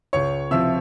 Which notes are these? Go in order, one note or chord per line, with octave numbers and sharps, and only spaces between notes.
C#2 C#5 C#6
C3 F3 E5 E6